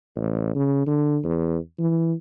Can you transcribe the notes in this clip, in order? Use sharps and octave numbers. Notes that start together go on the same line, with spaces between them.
A1
C#3
D3
E2
E3